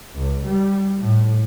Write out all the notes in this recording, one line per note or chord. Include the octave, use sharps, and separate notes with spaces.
C#2
G3
A2